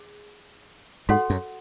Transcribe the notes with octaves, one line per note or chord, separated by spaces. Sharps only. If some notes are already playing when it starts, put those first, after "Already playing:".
Already playing: G#4
G#2 F#4 A4 C#5 F#5 C6
F#2